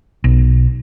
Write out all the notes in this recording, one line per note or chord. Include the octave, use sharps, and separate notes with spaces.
B1